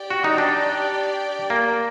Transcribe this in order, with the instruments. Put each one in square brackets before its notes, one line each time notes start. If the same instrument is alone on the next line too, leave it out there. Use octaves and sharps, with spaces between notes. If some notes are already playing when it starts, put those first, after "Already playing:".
Already playing: [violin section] G4 D5 G5
[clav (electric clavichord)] F#4
D#4
D4
A#3